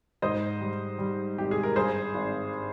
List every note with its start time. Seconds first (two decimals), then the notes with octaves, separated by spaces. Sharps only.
0.22 G#2 C5 D#5
0.61 G3
0.98 G3
1.38 G#1 G4
1.51 G#4
1.63 A#4
1.76 G2 G#4 C5
2.14 G#1